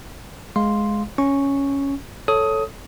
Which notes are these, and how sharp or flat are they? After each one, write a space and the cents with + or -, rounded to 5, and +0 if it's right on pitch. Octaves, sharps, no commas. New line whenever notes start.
G#3 +10 F5 +0 C6 +0
C#4 +0 C#6 +0
A4 +0 C#5 +0 D#6 +15